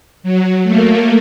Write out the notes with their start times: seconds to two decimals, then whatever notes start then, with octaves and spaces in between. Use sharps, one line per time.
0.23 F#3
0.63 A3 A#3